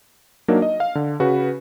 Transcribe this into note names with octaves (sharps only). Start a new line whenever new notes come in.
F#3 A#3 D4 D#4 A#4
D#5
F5
D3
C#3 F#4 B4